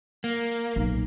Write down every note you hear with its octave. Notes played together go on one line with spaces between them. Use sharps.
A#3
B1